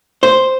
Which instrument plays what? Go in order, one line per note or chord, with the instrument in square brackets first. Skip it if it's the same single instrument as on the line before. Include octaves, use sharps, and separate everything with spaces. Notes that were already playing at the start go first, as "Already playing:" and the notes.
[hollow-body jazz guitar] C5